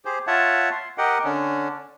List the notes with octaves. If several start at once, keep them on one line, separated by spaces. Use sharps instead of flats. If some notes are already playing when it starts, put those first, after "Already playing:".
G4 G#4 C5
F4 C#5 E5 F#5 A5
C6
G4 A#4 D#5 F#5 G5
D3 C#4 D4